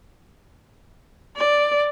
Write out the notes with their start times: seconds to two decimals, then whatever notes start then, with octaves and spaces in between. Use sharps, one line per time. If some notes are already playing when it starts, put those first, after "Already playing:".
1.36 D5